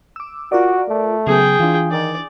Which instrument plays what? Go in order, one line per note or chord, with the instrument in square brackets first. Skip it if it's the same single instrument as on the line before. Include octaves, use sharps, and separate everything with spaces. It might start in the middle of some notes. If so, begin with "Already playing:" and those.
[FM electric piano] D6 E6
[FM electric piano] F4 A#4 D5 [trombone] F#4
[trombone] A3
[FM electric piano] C#3 F#3 B3 [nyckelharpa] G#4 G5
[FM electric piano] E3 D4 [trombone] F4
[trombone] D#3 [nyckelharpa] D5